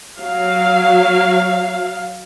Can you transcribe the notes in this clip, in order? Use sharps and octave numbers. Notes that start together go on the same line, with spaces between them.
F#3 F5